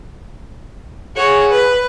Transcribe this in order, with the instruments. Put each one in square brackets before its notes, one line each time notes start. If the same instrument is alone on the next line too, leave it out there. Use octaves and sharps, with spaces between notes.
[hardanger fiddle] F#4 C#5 [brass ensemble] G#4
[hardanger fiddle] B4